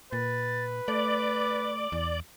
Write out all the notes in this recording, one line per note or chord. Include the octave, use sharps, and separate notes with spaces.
A#2 B4 A6
A3 D5 D6
E2